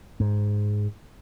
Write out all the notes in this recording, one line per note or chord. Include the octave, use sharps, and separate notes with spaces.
G#2